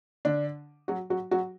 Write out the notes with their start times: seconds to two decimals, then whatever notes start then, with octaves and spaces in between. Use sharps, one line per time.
0.25 D3 D4
0.88 F#3 F#4
1.10 F#3 F#4
1.31 F#3 F#4